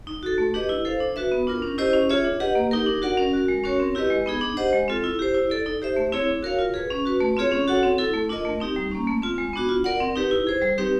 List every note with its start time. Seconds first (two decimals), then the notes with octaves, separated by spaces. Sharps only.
0.07 D#4
0.23 F#4 A4
0.38 A3
0.54 D4 G4 B4 D#5
0.69 E4
0.85 A4 C5 F5
1.00 D4
1.16 F#4 B4 E5
1.32 B3
1.47 D4 F4 A#4
1.62 C#4
1.78 E4 G4 C5 D#5
1.93 C#4
2.09 F4 G#4 C#5 E5
2.25 D4
2.40 G4 B4 D#5 F#5
2.55 A#3
2.71 D#4 G4 A#4
2.86 D4
3.02 F#4 A#4 D5 F#5
3.18 C#4
3.33 F#4 A#4
3.48 G#3
3.64 C#4 F#4 A#4 C#5
3.80 C4
3.95 E4 G4 B4 D#5
4.10 G#3
4.26 B3 D#4 G#4
4.41 D4
4.57 G4 C5 D#5 F#5
4.73 G#3
4.88 C4 F4 A4
5.04 E4
5.19 G4 C5
5.35 E4
5.50 A4 D5
5.66 D#4
5.82 G4 C5 E5
5.96 A3
6.12 C4 E4 G#4 C#5
6.28 D4
6.43 F#4 A#4 C#5 F5
6.59 F4
6.74 G#4 B4
6.90 C#4
7.05 F#4 B4
7.21 A3
7.37 C4 F4 G#4 C#5
7.52 C#4
7.68 F#4 A4 C#5 F#5
7.83 C4
7.98 E4 A4
8.13 A3
8.29 D4 F4 A#4 D#5
8.45 A3
8.60 C4 D#4 G4
8.76 G3
8.92 A#3 C#4
9.07 A3
9.22 C4 F4
9.38 G#3
9.53 B3 D4 F#4
9.69 F4
9.84 A#4 D5 F#5
10.00 C4
10.16 D#4 G4 B4
10.31 E4
10.47 G#4 C5
10.62 G3
10.78 C4 D#4 G4 B4